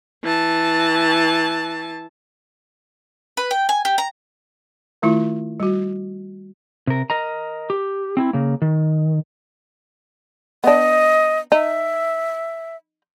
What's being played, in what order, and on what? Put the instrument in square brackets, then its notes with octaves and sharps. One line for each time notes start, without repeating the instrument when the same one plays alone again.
[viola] E3 A5
[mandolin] B4
G5
G#5
G4
A#5
[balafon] D#3 A3 E4 F4
G3 F#4
[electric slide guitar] C3 A#4
A#4 D#5 A#5
G4
C4 D#4 E4
C#3 A#3
D#3
[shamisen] B3 D4 [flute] D#5
[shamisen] D#4 [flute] E5